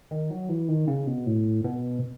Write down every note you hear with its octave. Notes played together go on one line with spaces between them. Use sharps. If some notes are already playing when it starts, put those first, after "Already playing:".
D#3
F#3
E3
D#3
C#3
B2
A2
B2